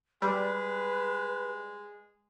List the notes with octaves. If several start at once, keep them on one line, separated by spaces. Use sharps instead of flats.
G3 G#3 B4